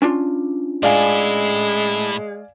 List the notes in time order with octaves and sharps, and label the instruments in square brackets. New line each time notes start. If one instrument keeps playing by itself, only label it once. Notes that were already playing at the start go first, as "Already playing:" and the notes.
[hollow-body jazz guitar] C#4 D4 F4
[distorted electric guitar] A2 E4 [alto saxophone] G#3 [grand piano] D5 F5 G#5